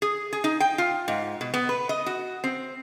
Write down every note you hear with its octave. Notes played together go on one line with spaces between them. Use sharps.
G#4
G#4
D#4
G5
F4
G#2
B2
B3
B4
D#5
F#4
C4